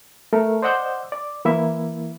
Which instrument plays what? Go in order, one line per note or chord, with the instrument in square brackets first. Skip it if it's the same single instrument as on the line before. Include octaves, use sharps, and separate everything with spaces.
[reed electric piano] A3 A4 A#4
C5 D5 D#5 F#5 E6 G6
D5
E3 A#3 E4 E5